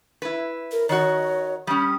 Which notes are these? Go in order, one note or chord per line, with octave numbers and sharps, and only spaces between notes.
E4 B4
A#4
D#3 F#4 C#5 D#5
G3 C#4 D#6